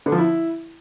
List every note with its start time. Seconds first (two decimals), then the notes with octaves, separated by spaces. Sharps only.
0.06 D3
0.12 F3
0.18 E4